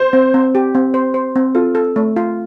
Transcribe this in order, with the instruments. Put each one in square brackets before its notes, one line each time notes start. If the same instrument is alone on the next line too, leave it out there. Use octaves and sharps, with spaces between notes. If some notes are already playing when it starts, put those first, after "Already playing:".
Already playing: [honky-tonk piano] C5
[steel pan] C4
C4
G4
C4
C5
C5
C4
[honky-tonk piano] F4 [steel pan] A4
[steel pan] A4
A3
F4